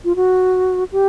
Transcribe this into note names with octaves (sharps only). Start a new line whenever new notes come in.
F4
F#4
G4